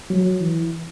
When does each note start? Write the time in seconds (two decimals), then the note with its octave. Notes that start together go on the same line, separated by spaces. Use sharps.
0.10 F#3
0.41 E3